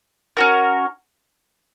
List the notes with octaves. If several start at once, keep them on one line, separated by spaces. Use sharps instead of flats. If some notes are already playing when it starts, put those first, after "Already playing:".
C#4 F#4 A#4